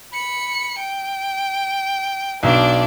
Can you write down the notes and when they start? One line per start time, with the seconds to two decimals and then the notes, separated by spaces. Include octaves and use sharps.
0.13 B5 C#7
0.78 G5
2.43 B1 D4 D5